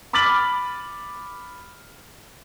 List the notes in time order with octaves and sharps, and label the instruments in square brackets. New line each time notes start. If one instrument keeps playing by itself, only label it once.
[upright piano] B5 D6 F6 A6 B6 F#7